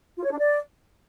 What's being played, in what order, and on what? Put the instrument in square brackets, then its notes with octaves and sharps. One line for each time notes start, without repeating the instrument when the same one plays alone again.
[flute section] F4
C#5
D4
D5